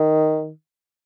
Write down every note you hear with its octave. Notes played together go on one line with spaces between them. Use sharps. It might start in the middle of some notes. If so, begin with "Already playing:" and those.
Already playing: D#3